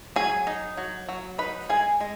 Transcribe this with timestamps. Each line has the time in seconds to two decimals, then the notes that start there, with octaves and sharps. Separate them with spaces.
0.16 F#3 G#4 G#5
0.47 D#4
0.77 F#3
1.09 F#3
1.38 D#4 B4 B5
1.69 G#3 G#4 G#5
2.00 G#3